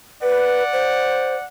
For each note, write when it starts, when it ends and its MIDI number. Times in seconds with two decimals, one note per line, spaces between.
0.22 0.64 71
0.22 1.46 74
0.22 1.46 78
0.73 1.35 72